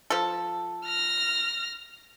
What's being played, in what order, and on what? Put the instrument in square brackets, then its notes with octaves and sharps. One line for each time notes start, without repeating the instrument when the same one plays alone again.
[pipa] F3 A4
[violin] F6 A#6